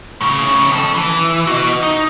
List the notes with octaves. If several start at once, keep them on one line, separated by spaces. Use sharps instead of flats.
A2 C#3
F2 A4
E3
F#4 D#5
D#4